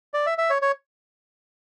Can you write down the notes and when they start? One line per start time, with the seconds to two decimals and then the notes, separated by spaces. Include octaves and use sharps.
0.14 D5
0.27 E5
0.38 E5
0.50 C#5
0.62 C#5